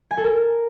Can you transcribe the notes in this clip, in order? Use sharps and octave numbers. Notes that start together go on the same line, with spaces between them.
G#5
A4
A#4